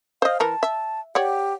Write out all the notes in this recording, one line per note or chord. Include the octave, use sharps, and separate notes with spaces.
C5 D#5 F5
E3 A#4 A5 A#5
E5
G4 C#5 D5 F#5